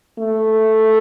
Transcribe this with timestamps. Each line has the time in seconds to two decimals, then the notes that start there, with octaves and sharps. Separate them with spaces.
0.19 A3